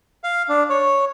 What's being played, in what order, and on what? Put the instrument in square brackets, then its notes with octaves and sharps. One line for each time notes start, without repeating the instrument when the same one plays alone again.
[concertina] F5
D4
C#5